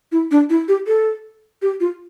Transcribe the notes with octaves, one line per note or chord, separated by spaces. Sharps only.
E4
D4
E4
G4
A4
G4
F4